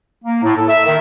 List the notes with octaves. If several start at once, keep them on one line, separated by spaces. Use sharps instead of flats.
A#3
A2
A4
E5
D#3